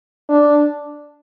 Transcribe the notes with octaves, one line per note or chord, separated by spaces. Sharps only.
D4